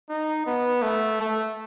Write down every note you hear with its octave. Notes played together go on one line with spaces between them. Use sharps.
D#4
B3
A3
A3